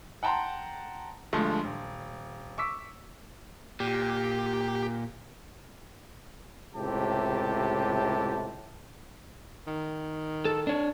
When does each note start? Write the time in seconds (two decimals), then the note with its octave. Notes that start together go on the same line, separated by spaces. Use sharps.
0.23 F#5 G5 A5 A#5 C6
1.33 D2 G2 F3 G#3 A3
1.64 D#1
2.58 C#6 D6 E6 B6
3.80 A#2 G4
6.76 C#2 A2 C3 G4 A5
9.67 D#3
10.45 A4
10.67 D4 C#5